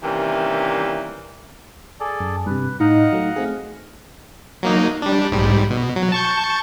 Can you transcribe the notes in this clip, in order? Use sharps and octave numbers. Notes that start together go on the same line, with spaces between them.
C3 D#3 E3 G3 A#3 C#4
G#4 A4 D5
F#2
G2 C3 B4
A2 D#4 D#5 F5 F#5
F#3 A3
A3 C4 G#4
F#3 A#3 D#4
G3 D4
B1 G#2 G3
B2
F#3
A5 C#6 G6